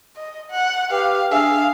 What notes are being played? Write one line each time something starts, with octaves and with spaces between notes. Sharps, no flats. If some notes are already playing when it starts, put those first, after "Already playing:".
D#5
F#5
G4 B4 F5
D4 G#4 E5 F5